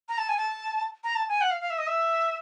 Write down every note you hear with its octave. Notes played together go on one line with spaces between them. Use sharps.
A#5
A5
G#5
A5
A#5
A5
G#5
F#5
F5
F5
E5
D#5
E5